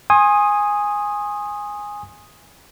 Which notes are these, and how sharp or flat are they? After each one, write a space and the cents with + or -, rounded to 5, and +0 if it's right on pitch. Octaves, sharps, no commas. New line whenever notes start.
G#5 -10 C6 +35 D#6 +0